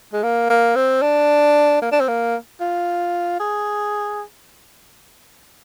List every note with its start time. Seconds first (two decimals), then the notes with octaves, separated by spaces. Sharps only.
0.13 G#3
0.23 A#3
0.50 A#3
0.76 C4
1.02 D4
1.82 A#3
1.91 D4
2.00 C4
2.08 A#3
2.60 F4
3.40 G#4